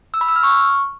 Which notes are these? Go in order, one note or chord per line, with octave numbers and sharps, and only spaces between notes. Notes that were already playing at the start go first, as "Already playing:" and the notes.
E6
B5
E6
F6
C#6